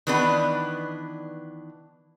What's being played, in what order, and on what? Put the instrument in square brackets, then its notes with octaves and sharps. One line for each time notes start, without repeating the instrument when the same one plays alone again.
[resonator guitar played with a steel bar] D#3 E3 B3 D4 B4